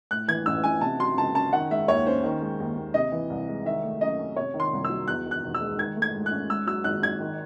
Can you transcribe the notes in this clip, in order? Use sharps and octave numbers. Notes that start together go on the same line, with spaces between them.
A2 F#6
E3 G#6
A1 E6
A1 G#5
C3 A5
F#3 C6
C#2 A5
C#4 A5
D#3 F#5
G#3 E5
D#2 C#5
C#4 C5
D#3
G#3
D#2
D#2
C3 D#5
E3
C2
G#3
D#3 E5
A3
F#2 D#5
C#4
C3 C#5
D#3
C6
C2
E6
F#3
E2 F#6
D#3
F#6
E1
E6
G#3
D#3 G#6
A3
G#6
G#2
F#6
C#4
G#2 E6
F#3 E6
G#1 F#6
G#1 G#6
D#3